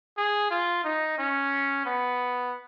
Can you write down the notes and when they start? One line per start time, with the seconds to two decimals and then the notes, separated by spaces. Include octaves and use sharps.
0.18 G#4
0.51 F4
0.84 D#4
1.18 C#4
1.86 B3